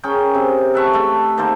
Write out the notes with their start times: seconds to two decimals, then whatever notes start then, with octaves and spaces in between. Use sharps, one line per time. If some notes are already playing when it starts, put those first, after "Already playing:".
0.04 C#4 G#4 A#4 G5
0.34 C3
0.74 A4 B4 E5 C#6
0.93 A3 A4
1.37 D#3 A#3 A4 C5